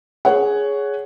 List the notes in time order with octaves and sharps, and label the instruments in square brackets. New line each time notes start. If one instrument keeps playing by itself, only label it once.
[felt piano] G#4 C#5 F#5